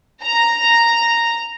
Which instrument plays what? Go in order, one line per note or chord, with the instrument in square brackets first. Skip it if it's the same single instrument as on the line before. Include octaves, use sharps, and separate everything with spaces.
[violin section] A#5